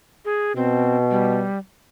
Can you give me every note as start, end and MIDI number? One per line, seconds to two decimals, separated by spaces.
0.25 0.52 68
0.56 1.46 47
0.56 0.97 60
1.10 1.58 55